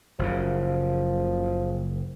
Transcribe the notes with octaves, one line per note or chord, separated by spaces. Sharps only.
F#1 C#3 F3